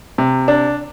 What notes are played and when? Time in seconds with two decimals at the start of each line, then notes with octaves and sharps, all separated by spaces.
0.18 C3
0.48 D4